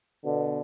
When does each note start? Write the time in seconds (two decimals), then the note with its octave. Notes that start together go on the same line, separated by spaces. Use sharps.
0.24 B2 D3